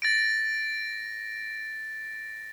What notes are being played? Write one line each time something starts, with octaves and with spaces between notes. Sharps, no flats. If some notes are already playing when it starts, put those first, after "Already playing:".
A6 A#6 D7